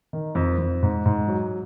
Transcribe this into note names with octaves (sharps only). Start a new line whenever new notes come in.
D#3
F2
F2
G#2
G#2
F#3